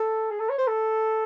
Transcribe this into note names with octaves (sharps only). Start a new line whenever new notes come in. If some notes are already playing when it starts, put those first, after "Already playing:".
Already playing: A4
G#4
A4
C#5
C5
A4